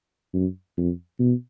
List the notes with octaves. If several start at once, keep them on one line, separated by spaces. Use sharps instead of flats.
F#2
F2
B2